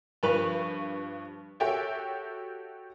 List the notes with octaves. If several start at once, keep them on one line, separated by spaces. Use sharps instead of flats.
G2 F3 B4 C#6 F7 F#7
F#4 G4 A4 C#5 E5 G5